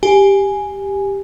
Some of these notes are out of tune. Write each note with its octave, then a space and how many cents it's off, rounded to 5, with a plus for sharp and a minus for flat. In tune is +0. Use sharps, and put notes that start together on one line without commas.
G4 +5 G#5 +0